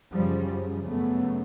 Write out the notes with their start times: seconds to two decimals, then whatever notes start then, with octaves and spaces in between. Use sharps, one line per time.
0.13 F#2 C#3 F3 G3
0.88 F#2 C#3 A3 B3